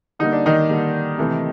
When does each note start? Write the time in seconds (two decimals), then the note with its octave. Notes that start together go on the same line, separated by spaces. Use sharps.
0.19 D3 G3 A#3 D#4
0.32 D4
0.46 D#3 D#4
0.69 D3 G3 A#3
1.18 C3 E3 A3